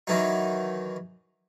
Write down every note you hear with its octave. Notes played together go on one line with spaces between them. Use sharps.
D#3 E3 F#3 D#4